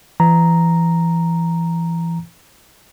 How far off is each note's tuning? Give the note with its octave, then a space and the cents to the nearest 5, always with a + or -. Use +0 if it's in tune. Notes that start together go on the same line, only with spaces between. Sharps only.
E3 +30 A#5 +0